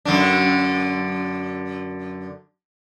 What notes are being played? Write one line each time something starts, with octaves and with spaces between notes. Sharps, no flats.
F#2 D3 D4